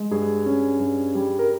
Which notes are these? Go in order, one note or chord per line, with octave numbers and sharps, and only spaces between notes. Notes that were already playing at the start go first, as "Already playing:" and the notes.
Already playing: G#3
G2 G#4
C#4
G2
G3
A#4